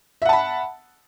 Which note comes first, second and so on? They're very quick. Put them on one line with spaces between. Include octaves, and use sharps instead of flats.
E5 F#5 A5 B5